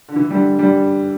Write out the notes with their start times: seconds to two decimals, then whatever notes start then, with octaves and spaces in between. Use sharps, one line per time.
0.09 D3
0.16 E3
0.30 D3 G3
0.59 D3 G3